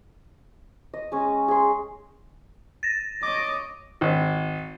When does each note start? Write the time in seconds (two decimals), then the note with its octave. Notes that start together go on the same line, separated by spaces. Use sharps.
0.94 D#5
1.12 G#3 C#4
1.48 G#4 C6
2.83 A6 A#6
3.23 C#5 D#5 D6
4.01 G#1